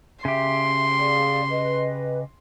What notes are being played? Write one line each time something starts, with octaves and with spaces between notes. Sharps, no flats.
C#3 G4 E5 C6
G#4 D5 F5
B4 D#5